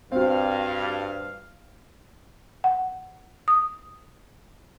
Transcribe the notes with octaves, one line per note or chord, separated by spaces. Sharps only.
G2 C4 F#4 F5
F#5
D#6